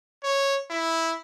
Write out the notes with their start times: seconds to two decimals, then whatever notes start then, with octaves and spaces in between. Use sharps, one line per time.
0.23 C#5
0.70 E4